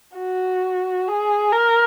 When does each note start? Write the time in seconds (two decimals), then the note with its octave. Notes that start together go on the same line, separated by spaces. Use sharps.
0.18 F#4
1.08 G#4
1.52 A#4